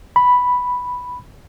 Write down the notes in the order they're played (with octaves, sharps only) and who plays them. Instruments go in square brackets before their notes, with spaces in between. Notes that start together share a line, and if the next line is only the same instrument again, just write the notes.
[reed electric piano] B5